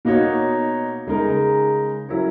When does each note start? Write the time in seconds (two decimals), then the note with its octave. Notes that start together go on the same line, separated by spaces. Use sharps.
0.05 B2 A#3 D#4 F#4 C#5
1.07 C#3 G#3 D#4 A#4
2.09 F#3 C#4 E4 A#4 C#5